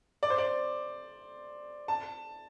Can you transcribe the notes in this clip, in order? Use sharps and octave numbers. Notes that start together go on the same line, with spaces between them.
D5
C5
D5
A5